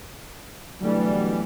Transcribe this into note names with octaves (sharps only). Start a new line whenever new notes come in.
B2 D3 E3 F#3 G3 A3